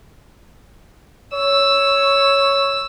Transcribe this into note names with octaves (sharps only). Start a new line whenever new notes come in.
C#5 E6